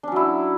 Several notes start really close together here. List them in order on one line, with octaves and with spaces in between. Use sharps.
D4 C#4 F#3 E4